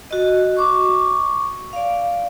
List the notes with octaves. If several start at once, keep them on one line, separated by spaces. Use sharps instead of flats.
F#4 D#5
C#6 D6
D5 F5